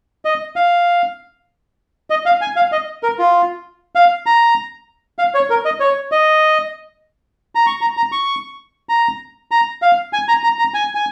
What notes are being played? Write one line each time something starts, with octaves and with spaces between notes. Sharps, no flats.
D#5
F5
D#5
F5
G#5
F5
D#5
A#4
F4
F5
A#5
F5
C#5
A#4
D#5
C#5
D#5
A#5
C#6
A#5
A#5
C#6
A#5
A#5
F5
G#5
A#5
A#5
A#5
G#5
G#5